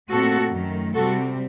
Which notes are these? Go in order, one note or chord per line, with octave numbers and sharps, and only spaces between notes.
A#2 A3 C4 F#4 A4
F#2 D#3 A3
C3 G3 C4 F#4 A4